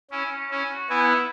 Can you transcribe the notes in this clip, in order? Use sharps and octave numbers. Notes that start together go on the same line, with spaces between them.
C#4 E4
E4
C#4
C#4 E4
F#4
B3 E4 G#5
F#5
E5